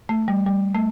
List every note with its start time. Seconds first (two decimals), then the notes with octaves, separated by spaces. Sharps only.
0.09 A3
0.28 G3
0.46 G3
0.74 A3